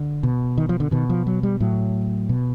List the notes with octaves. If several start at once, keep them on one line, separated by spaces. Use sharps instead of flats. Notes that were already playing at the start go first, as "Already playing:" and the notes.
Already playing: D3
B2
D#3
F3
D3
B2 D#3
F3
F#3
G3
A2 F#3
B2